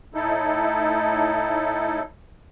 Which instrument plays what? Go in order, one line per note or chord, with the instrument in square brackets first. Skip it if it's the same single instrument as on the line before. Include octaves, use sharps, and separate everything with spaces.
[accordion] A2 D#4 E4 A4